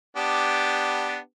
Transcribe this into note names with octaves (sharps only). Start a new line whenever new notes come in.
B3 D4 G4